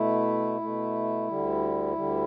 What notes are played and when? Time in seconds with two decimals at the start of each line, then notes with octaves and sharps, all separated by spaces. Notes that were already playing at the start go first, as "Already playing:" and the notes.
Already playing: B2 A3 E4
0.61 B2 A3
1.28 D2 D3 G3
1.95 D2 D3 G3